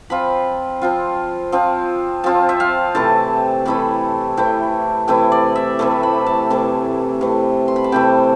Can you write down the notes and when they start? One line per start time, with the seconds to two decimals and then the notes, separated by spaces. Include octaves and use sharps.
0.10 F3 C4 F4 B5
0.82 F3 C4 F4
1.52 F3 C4 F4
2.24 F3 C4 F4 A5
2.49 E5
2.60 F5
2.95 C3 E3 A3 E4 A5
3.65 C3 E3 A3 E4 B5
4.37 C3 E3 A3 E4 G5
5.08 C3 E3 A3 E4 G5
5.32 D5
5.56 E5
5.79 C3 E3 A3 B5
6.03 B5
6.26 A5
6.50 C3 E3 A3
7.21 C3 E3 A3
7.68 C6
7.76 B5
7.84 A5
7.92 C3 E3 A3 G5